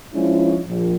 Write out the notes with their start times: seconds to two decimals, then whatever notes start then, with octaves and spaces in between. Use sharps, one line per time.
0.14 F3 G#3 C#4 D4 E4
0.67 A#1